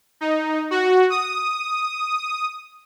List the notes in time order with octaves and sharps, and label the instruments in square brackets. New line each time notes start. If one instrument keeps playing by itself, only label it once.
[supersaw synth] D#4
F#4
D#6